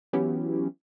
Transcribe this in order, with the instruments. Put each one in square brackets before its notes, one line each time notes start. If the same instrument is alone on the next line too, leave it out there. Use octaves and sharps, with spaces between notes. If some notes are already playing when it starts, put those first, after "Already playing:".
[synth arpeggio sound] E3 F#3 B3 C#4 E4 G4